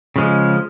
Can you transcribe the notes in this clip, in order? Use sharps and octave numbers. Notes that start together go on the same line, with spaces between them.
C#3 F3 G#3